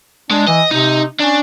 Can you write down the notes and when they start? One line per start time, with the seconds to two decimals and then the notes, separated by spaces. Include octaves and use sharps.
0.31 G#3 D4
0.47 E3 D#5
0.71 C3 D#4
1.20 C#4 D4